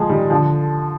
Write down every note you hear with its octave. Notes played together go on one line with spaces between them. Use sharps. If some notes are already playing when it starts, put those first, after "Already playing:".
Already playing: F3 G#3
D#3 G3
D3 F3